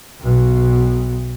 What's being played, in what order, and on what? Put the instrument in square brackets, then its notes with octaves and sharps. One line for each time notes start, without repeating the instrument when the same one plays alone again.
[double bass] B1 B2